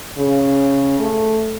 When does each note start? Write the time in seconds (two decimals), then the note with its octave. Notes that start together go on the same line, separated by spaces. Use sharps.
0.18 C#3
0.99 A3